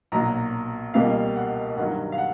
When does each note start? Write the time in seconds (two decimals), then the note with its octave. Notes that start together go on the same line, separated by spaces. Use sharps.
0.12 B1 A#2 F#3 A#5
0.94 C#2 B2 G3 A#3 F5
1.36 F#5
1.77 G2 D#3 F#3 F#5
2.12 F5
2.18 F#5